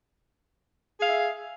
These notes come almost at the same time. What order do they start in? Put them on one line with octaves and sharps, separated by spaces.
G#4 F5 E5